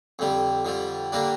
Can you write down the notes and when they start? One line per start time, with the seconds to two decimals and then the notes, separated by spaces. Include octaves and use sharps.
0.19 F2 D3 G3
0.65 F2 D3 G3
1.12 D3 G3 A#3 D4